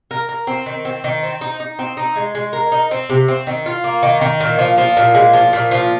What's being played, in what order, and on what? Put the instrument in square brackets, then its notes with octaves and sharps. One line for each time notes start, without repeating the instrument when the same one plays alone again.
[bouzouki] A#4
A#4
C4
D#3
C4
D#3
C4
D#4
D#4
C4
D#4
G#3
G#3
A#4
D#4
C4
C3
C4
D#3
F4
A#3
D#3
D#3
A#2
F3
F3
A#2
G#3
F3
A#2
F3